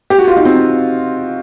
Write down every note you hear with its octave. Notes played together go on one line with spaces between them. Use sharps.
G4
F#4
F4
D#4
C4